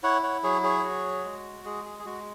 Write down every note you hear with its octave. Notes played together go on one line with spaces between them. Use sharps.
E4 C#5 F#5
C#5 F#5
F#3 G#4 C#5
G#4 C#5
F#4
G#3
G#3 G#4
G#4
G#4
G#3 F#4